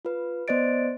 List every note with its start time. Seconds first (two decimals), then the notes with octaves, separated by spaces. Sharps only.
0.05 F4 B4
0.48 B3 C5 D5 D#5 A6 D7